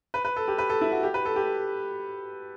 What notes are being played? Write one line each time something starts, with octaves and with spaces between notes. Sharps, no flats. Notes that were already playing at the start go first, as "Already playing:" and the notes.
B4
B4
A4
G4
B4
A4
E4
F#4
G4
B4
A4
G4